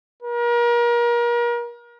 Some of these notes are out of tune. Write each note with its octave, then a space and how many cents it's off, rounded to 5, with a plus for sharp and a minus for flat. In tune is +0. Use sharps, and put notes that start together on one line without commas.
A#4 +35